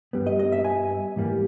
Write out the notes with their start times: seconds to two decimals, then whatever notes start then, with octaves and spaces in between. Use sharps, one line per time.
0.13 G2 G3 B3
0.27 D#5
0.39 D#5
0.52 E5
0.65 G#5
1.16 G#2 E3 G3 A#3